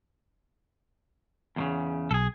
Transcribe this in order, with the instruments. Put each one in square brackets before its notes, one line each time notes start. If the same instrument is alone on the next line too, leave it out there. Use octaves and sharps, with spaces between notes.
[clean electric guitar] E2 A#2 C#3
[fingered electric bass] B1 [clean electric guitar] G#4 A4